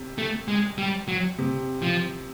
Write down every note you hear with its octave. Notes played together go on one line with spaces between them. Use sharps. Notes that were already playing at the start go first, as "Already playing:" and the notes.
Already playing: C3
A3
G#3
G3
F#3
C3
F3